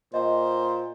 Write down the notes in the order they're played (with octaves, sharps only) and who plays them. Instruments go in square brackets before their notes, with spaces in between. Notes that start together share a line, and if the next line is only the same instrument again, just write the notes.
[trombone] A#2 [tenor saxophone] C5 [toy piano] D#5